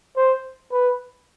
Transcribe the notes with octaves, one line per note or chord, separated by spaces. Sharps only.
C5
B4